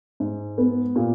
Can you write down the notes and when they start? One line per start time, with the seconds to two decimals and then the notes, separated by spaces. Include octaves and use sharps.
0.20 G#2
0.58 B3
0.96 A#2